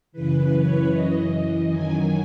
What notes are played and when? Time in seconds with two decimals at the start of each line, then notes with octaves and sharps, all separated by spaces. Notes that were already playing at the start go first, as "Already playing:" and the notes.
0.12 F#2 C#3 E3 B4
0.51 C#5
0.91 F#2 E3 D#5
1.69 F#2 D#3 F#3 G#5